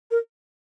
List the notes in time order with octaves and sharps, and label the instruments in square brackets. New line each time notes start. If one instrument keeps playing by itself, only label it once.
[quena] A#4